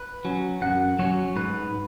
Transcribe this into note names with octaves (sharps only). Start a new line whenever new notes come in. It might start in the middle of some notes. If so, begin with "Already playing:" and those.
Already playing: B4
F#3 C#4
F#2 F#5
F#3 C#4 C#5
G#2 B4